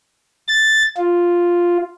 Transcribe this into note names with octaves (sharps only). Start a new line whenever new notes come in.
A6
F4